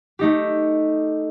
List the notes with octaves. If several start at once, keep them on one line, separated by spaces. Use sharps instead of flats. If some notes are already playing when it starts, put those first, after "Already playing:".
A3 D#4 G4